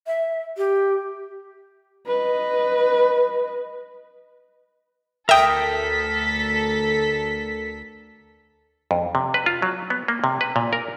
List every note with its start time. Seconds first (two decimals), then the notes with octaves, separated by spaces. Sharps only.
0.07 E5
0.57 G4
2.07 B4 D#5
5.29 D2 A4 A#4 E5 G5 D#6 B6
8.91 F2
9.15 C3
9.34 B4
9.46 F4
9.62 F#3
9.90 B3
10.08 A#3
10.24 C3
10.41 B4
10.56 A#2
10.73 A#4